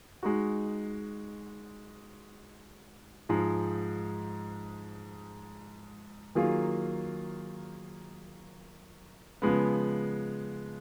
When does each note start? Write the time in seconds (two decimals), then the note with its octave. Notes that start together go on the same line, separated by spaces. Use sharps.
0.23 G#3 D#4 F#4
3.29 G#2 F3 G#3
6.35 D#3 F#3 A#3 F4 G#4
9.42 C#3 F3 G#3 B3